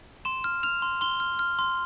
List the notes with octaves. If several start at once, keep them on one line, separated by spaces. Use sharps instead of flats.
C6 E7
F6
F6 F7
C6
C6 G7
F6
F6
C6